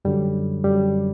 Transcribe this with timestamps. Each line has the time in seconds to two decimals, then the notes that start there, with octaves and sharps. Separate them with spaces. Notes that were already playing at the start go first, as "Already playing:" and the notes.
0.05 F#2 D3 F#3 G3
0.64 F#2 D3 F#3 G3